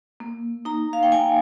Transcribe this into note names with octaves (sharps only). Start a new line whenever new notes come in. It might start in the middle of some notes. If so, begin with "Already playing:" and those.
A#3
D#4 A#5
F5
G5
A#3 G#5